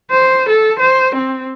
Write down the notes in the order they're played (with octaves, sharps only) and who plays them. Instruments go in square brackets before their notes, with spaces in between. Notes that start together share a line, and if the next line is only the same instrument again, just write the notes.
[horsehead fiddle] C5
A4
C5
C4